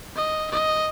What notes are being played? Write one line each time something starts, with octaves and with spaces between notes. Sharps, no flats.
D#5
D#5